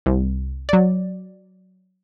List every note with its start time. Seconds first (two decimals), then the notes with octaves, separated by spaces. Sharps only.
0.06 C2
0.69 F#3 D5